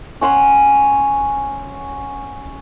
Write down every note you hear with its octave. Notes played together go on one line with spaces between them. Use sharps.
C#4 F#5 C6